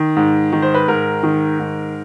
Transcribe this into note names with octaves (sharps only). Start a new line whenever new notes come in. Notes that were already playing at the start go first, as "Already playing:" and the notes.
Already playing: D#3
G#2
D#3
C5
B4
G#2 A#4
D#3
G#2